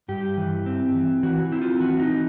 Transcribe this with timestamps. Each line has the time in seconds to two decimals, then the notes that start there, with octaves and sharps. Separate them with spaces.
0.08 G2 G4
0.37 E3
0.66 C4
0.95 E3
1.23 E3 F#4
1.52 C4 E4
1.62 F4
1.80 E3 F#4
2.00 D#4
2.10 E3